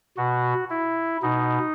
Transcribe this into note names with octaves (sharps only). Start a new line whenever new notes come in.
B2 F#4
E4
B2 D#4